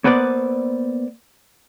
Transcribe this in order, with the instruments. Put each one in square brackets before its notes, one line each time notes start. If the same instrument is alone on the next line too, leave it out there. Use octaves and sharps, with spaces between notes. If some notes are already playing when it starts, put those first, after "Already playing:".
[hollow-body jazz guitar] A#3 B3 B4 C5 D5